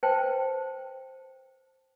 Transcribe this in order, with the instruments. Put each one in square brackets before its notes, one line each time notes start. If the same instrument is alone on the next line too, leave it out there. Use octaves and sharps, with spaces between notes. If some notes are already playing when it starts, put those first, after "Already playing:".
[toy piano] B4 C5 G5 A5